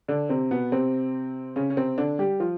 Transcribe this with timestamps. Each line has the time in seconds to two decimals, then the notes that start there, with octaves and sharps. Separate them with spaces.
0.08 D3 D4
0.29 C3 C4
0.51 B2 B3
0.72 C3 C4
1.56 C#3 C#4
1.70 C#4
1.77 C3 C4
1.98 D3 D4
2.19 G3 G4
2.40 F3 F4